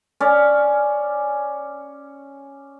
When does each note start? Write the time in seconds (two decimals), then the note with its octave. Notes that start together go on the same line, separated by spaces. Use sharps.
0.20 C#4 D5